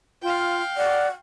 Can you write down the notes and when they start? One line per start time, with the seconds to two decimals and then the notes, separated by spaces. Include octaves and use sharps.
0.23 F4 F5 G5
0.77 D5 F#5